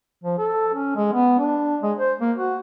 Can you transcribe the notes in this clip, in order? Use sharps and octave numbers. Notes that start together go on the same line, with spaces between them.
F3
A4
C#4
G#3
B3
D4
G#3
C5
A#3
F#4